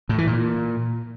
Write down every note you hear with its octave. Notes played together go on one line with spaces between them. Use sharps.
A2
E3
A#2